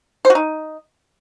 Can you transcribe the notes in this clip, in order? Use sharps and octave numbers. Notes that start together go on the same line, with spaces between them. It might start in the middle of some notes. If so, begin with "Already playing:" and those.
C5
F#4
D#4